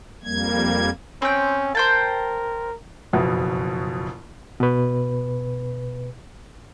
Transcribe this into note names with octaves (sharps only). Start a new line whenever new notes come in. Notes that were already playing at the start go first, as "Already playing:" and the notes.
F2 G3 A#3 G#6
C4 C#4 G5
A#4 C5 G5 A5
F#1 F2 B2
B2 B4